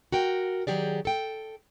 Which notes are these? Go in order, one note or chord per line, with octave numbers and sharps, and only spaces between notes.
F#4 A#4 G5
D#3 F#3 G4 G#4 D5
A4 G5